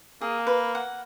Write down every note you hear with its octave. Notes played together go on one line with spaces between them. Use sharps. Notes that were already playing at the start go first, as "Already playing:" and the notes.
A#3 G#4
B4
F#5